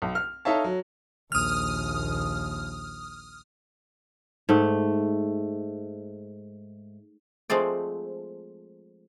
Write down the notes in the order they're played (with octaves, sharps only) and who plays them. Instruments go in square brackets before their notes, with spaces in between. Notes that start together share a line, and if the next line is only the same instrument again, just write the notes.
[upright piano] B1
F6
D#4 A4 C#5 E5 F5 A5
F#3
[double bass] A#1 D#2 [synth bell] D#6 F6
[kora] G#2 A3
[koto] F3 G#3 A3 C4 D5